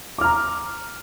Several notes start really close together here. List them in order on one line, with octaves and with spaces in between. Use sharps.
D6 F6 A#5